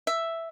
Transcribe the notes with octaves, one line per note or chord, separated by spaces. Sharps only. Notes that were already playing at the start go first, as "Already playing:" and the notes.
E5